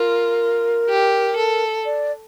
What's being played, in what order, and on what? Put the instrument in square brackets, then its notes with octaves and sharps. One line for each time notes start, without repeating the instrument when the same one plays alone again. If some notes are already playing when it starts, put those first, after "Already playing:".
Already playing: [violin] F4 [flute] A#4
[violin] G4
A4
[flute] D5